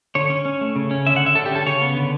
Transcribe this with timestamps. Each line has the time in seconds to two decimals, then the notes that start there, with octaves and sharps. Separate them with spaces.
0.15 D3 C#5
0.30 C#4
0.45 C#4
0.61 A3
0.76 C#3
0.91 C#4
1.06 D3 E5
1.16 F#5
1.21 C#4
1.26 E5
1.35 D3 A4
1.46 G4
1.52 C#4 A4
1.66 C#3 C#5
1.82 B3
1.97 D3